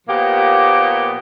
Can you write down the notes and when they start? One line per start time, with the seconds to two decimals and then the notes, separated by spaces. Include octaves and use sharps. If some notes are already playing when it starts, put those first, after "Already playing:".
0.08 A#2 F3 A#3 B3 G4